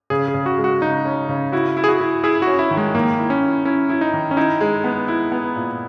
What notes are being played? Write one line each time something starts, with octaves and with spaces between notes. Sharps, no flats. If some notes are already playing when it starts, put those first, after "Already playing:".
C#3 G#4
G#4
C#3
F#4
G#3
F#4
C#3 D#4
C#4
C#3
E4 F#4
E4
G#4
F#4
E4
E4 G#4
F#4
C#4
E4
D#3
G#3
D#3 A#3
E4
C#4
E4
C#4 E4
E4
D#4
D#3
C#4
D#4 E4
G#3
B3
E4
B3
A#2